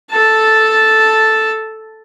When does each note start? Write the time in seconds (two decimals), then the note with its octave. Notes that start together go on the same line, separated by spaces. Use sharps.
0.11 A4 A5